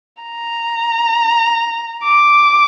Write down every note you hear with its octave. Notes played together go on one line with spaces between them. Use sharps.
A#5
D6